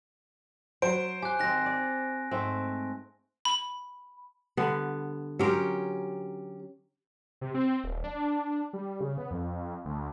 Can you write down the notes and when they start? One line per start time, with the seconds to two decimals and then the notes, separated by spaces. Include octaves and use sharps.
0.82 F#3 C5 D7
1.22 G4 G#5 F#6
1.39 D#3 C4 F#6 A#6
1.66 D5
2.31 G#2 A3 C4
3.45 B5
4.57 D3 G3 B3
5.39 F#3 C#4 G4 A#4 C5
7.41 C3
7.54 C4
7.84 D#1
8.04 D4
8.73 G3
9.01 C#3
9.17 B3
9.31 F2
9.85 D2